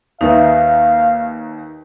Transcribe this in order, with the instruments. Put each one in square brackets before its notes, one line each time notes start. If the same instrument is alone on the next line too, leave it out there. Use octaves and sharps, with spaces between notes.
[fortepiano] D#2 D#3 [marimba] D#4 B4 E5 [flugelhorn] F5